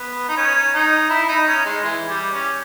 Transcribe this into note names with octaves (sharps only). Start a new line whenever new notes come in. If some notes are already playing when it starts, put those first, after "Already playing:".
Already playing: B3
D#4
C#4
D#4
E4
D#4
C#4
G#3
E3
G3
C#4